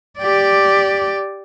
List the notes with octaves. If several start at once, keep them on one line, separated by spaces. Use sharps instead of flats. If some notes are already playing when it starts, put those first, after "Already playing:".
G4 D5